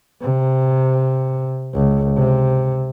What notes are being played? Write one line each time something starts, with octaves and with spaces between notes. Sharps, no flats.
C3
C#2
C3